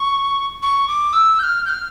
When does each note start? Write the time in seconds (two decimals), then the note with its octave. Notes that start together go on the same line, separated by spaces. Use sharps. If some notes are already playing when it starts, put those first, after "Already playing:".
Already playing: C#6
0.62 C#6
0.88 D6
1.13 E6
1.39 G6
1.43 F6
1.65 G6
1.69 F6